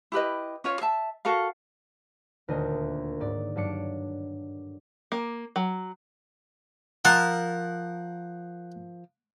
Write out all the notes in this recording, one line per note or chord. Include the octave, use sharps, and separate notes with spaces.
E4 G4 B4 D#5
C#4 F4 C#5
E5 A5
F#4 A4 A#4 F5
D#1 D2 D3 A#4 D#5 G6
G#2 D5
G2 F#3 D4 C#7 D7
A#3
F#3
F3 A#4 F#5